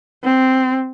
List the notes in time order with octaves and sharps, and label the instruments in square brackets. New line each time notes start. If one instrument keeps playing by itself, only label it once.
[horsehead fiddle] C4